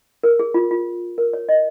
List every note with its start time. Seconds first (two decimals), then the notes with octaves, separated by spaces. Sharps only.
0.23 A#4
0.39 G#4
0.54 F4
0.71 F4
1.18 A#4
1.33 C#5
1.49 D#5